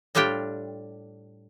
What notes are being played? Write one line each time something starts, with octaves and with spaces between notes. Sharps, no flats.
A2 G3 D4 F4 G4 G5